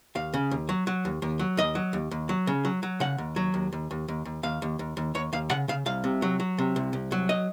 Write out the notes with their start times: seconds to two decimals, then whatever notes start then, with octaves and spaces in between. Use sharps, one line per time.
0.15 D#2 F5
0.34 C#3
0.51 D#2
0.69 F#3
0.87 F#3
1.05 D#2
1.22 D#2
1.39 F#3
1.57 D#2 D#5
1.75 F#3
1.93 D#2
2.11 D#2
2.29 F#3
2.47 C#3
2.65 F#3
2.83 F#3
3.00 C#3 F#5
3.18 D#2
3.36 F#3
3.54 D#2
3.73 D#2
3.91 D#2
4.08 D#2
4.25 D#2
4.43 D#2 F5
4.62 D#2
4.79 D#2
4.97 D#2
5.15 D#2 C#5
5.33 D#2 F5
5.50 C#3 F#5
5.68 C#3 F5
5.86 C2 F5
6.04 C3
6.22 F#3
6.40 F#3
6.58 C3
6.76 C2
6.93 C2
7.12 F#3
7.29 D#5